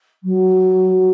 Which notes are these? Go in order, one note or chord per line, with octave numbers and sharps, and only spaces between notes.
F#3